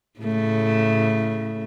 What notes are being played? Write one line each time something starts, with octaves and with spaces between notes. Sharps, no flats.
A2 C#3 A3